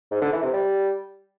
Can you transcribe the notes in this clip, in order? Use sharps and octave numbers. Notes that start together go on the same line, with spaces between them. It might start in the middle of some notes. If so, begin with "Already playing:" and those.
G#2
D3
E3
C3
G3